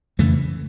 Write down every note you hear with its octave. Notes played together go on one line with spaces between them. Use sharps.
F2 C#3 E3 A3